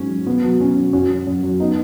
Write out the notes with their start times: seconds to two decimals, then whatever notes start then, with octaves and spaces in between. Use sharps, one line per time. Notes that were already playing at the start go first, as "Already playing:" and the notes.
Already playing: G#2 F#3 C#4
0.10 F#3
0.27 B2 B3
0.44 F#3
0.60 B2 C#4
0.77 F#3
0.93 F#2 C#4 F#4
1.09 F#3
1.27 F#2
1.43 F#3
1.60 B3 D#4